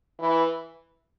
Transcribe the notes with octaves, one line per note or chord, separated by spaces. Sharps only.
E3